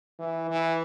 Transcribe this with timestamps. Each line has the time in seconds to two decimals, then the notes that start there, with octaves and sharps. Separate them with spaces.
0.19 E3
0.50 E3